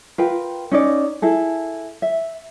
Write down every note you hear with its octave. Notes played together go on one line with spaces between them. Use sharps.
F4 A#4 B4 G5
C#4 D#4 D5
E4 G#4 A4
E5